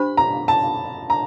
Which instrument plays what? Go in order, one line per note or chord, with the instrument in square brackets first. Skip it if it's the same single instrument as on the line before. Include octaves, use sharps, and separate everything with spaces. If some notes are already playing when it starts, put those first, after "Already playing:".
Already playing: [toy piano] D4 G4 C5 [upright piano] B5
[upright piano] A#5
A5
A#5